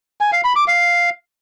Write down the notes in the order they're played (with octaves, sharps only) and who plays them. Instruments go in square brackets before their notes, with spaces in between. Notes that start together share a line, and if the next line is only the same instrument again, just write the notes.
[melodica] G#5
F5
B5
D6
F5